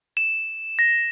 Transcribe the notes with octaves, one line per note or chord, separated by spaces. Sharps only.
E7
A#6